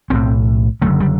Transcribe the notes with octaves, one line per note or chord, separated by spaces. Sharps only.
B1 A2 C4
F#1 F#2 D3 A3
G3